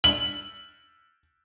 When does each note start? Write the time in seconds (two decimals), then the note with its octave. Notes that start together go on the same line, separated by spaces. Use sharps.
0.04 F#7